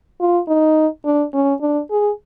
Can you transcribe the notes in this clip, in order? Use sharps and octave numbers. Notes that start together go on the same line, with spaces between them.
F4
D#4
D4
C#4
D4
G#4